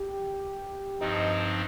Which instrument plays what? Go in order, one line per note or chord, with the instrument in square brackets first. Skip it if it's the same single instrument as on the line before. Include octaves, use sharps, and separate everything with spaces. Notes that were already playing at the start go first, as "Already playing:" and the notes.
Already playing: [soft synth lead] G4
[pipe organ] G2 F3 C4 D#4 [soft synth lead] D#5